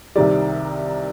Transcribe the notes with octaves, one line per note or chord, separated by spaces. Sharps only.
C2 C3 D#3 G3 D5